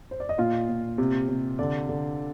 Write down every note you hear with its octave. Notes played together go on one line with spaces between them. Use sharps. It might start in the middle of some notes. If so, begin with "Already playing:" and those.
C5
D5
D#5
A#2 F4 F5
A#2
C3
C3
D3 D5
D3